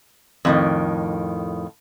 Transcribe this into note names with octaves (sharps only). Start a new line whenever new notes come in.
F2 A2 D#3